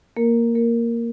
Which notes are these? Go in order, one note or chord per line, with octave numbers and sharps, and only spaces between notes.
A#3 A#4
A#3 A#4